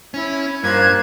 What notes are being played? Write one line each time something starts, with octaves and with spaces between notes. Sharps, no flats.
C#4 E4
G2 A#3 F4 C5 F#6 G#6